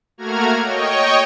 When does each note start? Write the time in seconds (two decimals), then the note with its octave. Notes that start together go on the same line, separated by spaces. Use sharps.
0.18 A3 A#3 F#4 A#5 F6 G#6
0.62 C#5 D#5 G5 C#6